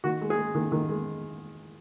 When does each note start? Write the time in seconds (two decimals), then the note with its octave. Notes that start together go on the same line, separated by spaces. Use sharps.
0.04 D#3 F#4
0.22 G#3
0.30 G#4
0.38 G#3
0.55 D#3
0.72 D#3
0.89 G#3